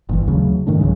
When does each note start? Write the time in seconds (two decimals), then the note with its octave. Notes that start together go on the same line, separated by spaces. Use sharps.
0.09 G1 A#2 E3
0.26 D#2 C#3 F#3 A3
0.67 G#2 D#3 A3 D4
0.79 C2 C#3 F#3 G#3